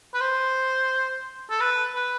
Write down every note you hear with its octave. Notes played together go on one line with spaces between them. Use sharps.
B4
C5
A4
B4
B4